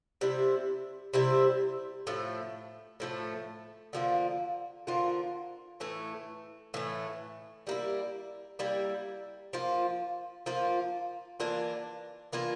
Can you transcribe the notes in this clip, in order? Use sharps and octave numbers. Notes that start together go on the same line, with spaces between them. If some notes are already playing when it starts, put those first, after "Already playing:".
C3 G3 C4 E4
C3 G3 C4 E4
A2 F3 A3
A2 F3 A3
D3 F3 A#3 F4
D3 F3 A#3 F4
A2 E3 A3
A2 E3 A3
G3 A#3 E4
G3 A#3 E4
F3 A#3 F4
F3 A#3 F4
E3 A#3 D4 F4
E3 A#3 D4 F4